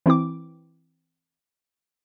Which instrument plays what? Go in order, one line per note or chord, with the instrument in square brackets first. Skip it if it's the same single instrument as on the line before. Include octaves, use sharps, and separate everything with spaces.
[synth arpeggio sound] E3 C4 E4 D6